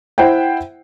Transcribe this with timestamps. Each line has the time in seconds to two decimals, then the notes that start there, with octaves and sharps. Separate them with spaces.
0.18 E4 C5 F#5 G5